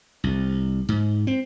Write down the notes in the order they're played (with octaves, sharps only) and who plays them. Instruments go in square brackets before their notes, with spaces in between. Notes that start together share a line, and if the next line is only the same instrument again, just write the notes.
[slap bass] C2
G#2
C4